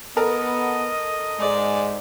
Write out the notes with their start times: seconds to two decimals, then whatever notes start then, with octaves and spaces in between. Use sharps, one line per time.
0.17 B3 A4 A#4 D#5
1.39 G#2 G#3 D5